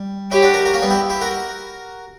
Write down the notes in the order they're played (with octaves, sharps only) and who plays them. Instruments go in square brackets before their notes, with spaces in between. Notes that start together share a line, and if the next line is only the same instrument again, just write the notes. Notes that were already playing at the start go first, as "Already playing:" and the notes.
Already playing: [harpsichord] G3
[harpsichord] C#4 E4 [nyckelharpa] G4
[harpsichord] D4 F#4
F#4 A#4
F#4 A#4
A#3 C#4
G3 B3
E4 G4
E4 G4
F#4 A#4